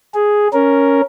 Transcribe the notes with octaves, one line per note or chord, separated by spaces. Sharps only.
G#4
C#4 A#4